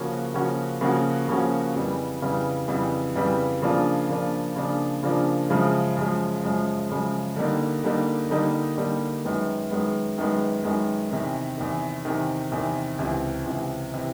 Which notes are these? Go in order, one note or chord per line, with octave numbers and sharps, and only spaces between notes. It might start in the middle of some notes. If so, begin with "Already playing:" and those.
Already playing: C#3 F3 A#3 C#4 F#4
C#3 F3 A#3 C#4 F#4
C#3 F3 A#3 C#4 F#4
C#3 F3 A#3 C#4 F#4
F2 C#3 E3 G3 B3
F2 C#3 E3 G3 B3
F2 C#3 E3 G3 B3
F2 C#3 E3 G3 B3
C#3 F3 A#3 D4 F4
C#3 F3 A#3 D4 F4
C#3 F3 A#3 D4 F4
C#3 F3 A#3 D4 F4
F#2 C#3 F3 G#3
F#2 C#3 F3 G#3
F#2 C#3 F3 G#3
F#2 C#3 F3 G#3
D3 G3 A#3 D#4
D3 G3 A#3 D#4
D3 G3 A#3 D#4
D3 G3 A#3 D#4
F#2 D#3 G#3 B3
F#2 D#3 G#3 B3
F#2 D#3 G#3 B3
F#2 D#3 G#3 B3
E2 C3 D#3
E2 C3 D#3
E2 C3 D#3
E2 C3 D#3
C#2 C3 E3
C#2 C3 E3
C3 E3